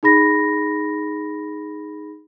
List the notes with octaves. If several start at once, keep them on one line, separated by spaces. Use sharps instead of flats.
D#4 G#4 B5 A#6